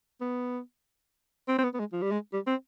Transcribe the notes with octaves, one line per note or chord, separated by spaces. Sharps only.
B3
C4
C4
B3
B3
G#3
F3
G3
G#3
G3
C4